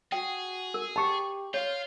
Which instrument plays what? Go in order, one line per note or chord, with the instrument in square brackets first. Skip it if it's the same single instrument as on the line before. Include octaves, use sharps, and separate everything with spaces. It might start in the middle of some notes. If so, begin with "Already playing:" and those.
[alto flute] F#4 [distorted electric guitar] G#4 [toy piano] G5
[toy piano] A#4
[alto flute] G4 [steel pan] A5 C#6 [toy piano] B5
[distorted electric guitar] F4 [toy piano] C#5 [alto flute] F5